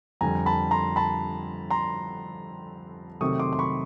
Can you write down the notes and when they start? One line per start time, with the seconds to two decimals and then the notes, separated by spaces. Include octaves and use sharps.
0.21 F2 D3 G3 G#5 A#5
0.46 A5 B5
0.71 A#5 C6
0.96 A5 B5
1.71 A#5 C6
3.21 C3 D#3 F#3 A3 C#6 D#6
3.40 C6 D6
3.53 C6
3.59 B5 C#6